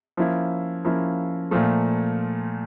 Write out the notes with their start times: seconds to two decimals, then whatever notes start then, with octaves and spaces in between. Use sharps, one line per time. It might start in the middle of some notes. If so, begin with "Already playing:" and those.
0.17 F3 A#3 C#4 E4
0.85 F3 A#3 C#4 E4
1.51 A#2 F3 A3